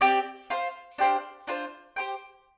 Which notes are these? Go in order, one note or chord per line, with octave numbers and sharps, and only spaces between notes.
C4 G4 D5
F4 C5 F5
D4 G4 C5 F5
D4 F4 C5
G4 C5 G5